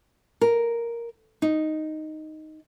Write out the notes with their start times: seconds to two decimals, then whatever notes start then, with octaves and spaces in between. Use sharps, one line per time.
0.41 A#4
1.42 D#4